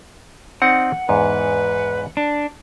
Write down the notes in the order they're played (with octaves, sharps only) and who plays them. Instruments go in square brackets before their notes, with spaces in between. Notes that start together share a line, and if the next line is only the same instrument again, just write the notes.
[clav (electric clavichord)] C4 D#4 D5 [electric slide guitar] F#5
[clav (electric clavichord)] E2 G#2 [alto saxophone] B4
[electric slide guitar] D4